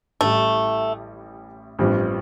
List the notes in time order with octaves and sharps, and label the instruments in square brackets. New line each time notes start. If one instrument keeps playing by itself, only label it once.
[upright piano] A1 A2 G3 [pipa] A3
[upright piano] A1 G2 F3 C4 G4